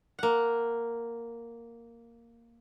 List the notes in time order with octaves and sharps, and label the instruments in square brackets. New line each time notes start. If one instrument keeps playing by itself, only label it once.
[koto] A#3 F#5